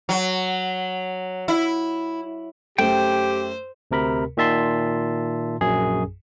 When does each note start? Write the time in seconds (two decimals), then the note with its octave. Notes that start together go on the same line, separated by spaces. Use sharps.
0.09 F#3
1.48 E4
2.78 F#2 A3 G4 C5 G5
3.91 D2 C3 A#4 B5
4.37 A#2 D#3 E5 A5 C6
5.61 A#1 F#2 G#4